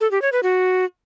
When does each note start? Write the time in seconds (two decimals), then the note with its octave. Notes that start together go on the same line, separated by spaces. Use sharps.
0.01 A4
0.11 G4
0.22 C#5
0.32 B4
0.43 F#4